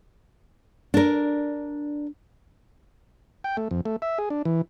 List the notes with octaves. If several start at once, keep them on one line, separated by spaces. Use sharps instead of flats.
D4 A#4
G5
A3
F2
A3
E5
G#4
D4
E3